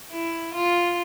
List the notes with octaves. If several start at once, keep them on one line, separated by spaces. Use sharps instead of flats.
E4
F4